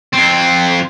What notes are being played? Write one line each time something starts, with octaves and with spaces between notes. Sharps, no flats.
F2 C4